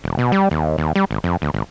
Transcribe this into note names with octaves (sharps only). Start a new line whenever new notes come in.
E1
B2
G3
D#2
D#2
G3
G#1
F2
D2
G#1